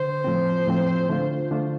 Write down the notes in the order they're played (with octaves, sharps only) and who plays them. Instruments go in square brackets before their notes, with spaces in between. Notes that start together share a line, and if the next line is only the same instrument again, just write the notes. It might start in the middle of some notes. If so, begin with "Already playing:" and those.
Already playing: [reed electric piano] D3 [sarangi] C5
[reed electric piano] A2 F3 C4
A2 F3 C4
D3 A3 D4 F4
D3 A3 D4 F4